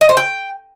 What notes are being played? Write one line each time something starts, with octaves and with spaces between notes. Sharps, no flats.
D#5
C5
G5